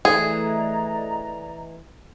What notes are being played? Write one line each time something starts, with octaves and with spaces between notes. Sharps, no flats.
E3 A3 G#4 D5 D#5 A#5